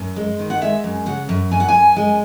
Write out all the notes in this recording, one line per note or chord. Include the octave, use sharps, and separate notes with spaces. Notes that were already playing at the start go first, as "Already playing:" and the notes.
Already playing: F#2
G#3
D#3
F#5
G#3 E5
F#2
C#3 F#5
F#2
F#2 G#5
F#5
G#5
F#2
G#3